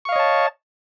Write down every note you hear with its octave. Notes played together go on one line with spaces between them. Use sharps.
C#5 D#5 F5 A5 C#6